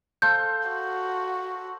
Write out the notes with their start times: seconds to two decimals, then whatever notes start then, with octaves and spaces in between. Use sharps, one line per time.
0.22 A4 C5 F5 G6
0.69 F#4